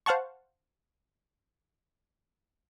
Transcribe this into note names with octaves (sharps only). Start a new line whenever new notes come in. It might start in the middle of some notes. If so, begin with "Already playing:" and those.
C5 F5 F#5 A5 C#6